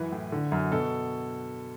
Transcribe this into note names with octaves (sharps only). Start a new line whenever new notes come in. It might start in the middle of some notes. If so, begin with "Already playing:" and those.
Already playing: F#2 E3 B4
A2
D3
F#2
B2 A4